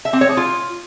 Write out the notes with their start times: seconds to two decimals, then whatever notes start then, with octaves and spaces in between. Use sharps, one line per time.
0.05 E5
0.13 C4
0.21 C#5
0.29 G#4
0.37 F4